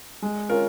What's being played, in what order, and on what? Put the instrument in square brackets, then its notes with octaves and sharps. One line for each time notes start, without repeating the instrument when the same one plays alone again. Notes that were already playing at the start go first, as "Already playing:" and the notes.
[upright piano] G#3
C#4 F4 A#4